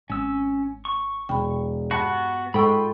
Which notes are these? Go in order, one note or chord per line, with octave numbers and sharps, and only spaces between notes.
G#1 C#4 E6
C#6
E1 G5 B5
G2 B3 F#4 A5 C#7
G#2 F4 A4 G5 B5 C#6 E6